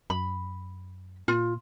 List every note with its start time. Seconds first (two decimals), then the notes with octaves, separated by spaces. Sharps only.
0.10 F#2 B5
1.28 A#2 F4